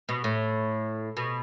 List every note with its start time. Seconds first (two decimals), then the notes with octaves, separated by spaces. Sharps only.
0.09 B2
0.24 A2
1.17 B2